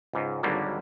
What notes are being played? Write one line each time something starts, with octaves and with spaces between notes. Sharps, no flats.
C#2 G#2
G#1 D#2 D3 F#3 G3 A#3